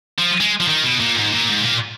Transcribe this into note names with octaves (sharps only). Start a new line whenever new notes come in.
F3
G#3
F3
D#3
B2
A#2
G#2
A#2
G#2
A#2